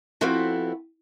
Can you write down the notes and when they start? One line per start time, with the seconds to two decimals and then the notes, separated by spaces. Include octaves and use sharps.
0.21 F3 B3 C4 E4 F#4 A4